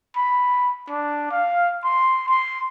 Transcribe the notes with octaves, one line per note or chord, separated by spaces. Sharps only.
B5
D4
F5
C6
C6